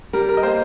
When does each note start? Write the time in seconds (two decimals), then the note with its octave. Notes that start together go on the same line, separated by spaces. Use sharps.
0.13 G3 A#4
0.29 A#4
0.37 D#5
0.43 A#3 C5